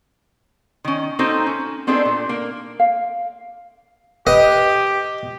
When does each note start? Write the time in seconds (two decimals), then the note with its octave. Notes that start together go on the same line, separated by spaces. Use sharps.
0.85 D#3 C#4
1.19 A#3 C4 D#4 F#4 A4 C5
1.46 C#4
1.87 B3 C4 D4 D#4 G#4 A4
2.05 A#2
2.29 A#3
2.80 F5
4.27 G4 B4 D#5